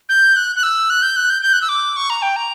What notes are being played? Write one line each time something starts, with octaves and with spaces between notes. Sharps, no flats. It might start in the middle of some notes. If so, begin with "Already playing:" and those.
G6
F#6
F#6
E6
F#6
G6
F#6
G6
G6
F#6
E6
D6
C#6
A#5
G5
A#5